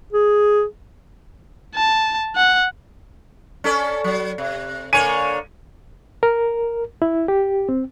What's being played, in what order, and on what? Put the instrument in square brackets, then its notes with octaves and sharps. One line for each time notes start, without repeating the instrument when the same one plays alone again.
[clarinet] G#4
[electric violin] A5
F#5
[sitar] C#4 A4 D5
F#3
C3
[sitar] D3 A#3 C#5 [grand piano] G#5 D#7
[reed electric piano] A#4
E4
G4
C4